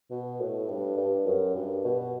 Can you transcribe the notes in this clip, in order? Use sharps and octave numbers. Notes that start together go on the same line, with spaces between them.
B2
A2
G2
G2
F#2
G2
B2